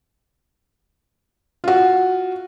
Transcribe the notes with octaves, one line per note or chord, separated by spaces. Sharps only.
F4 F#4